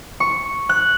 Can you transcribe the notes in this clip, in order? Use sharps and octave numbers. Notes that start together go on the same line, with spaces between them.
C#6
F#6